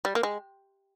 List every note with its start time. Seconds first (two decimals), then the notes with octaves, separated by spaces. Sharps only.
0.05 G3
0.15 A#3
0.23 G#3